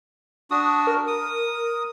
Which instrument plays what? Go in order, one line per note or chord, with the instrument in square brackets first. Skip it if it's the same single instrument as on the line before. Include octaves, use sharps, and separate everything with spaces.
[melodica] D4 F#4 [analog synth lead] D#6
[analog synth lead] A#4
[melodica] D#6